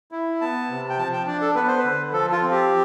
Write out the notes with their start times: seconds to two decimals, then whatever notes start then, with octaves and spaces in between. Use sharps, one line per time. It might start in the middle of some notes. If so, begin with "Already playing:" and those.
0.12 E4
0.41 B3 A5
0.69 C3
0.90 G5
0.98 F3 A5
1.13 G5
1.27 D4 D5
1.41 A4
1.55 B3 B4
1.68 C5
1.78 B4
1.84 D3
2.12 F3 A4
2.32 F4
2.42 C4
2.51 G4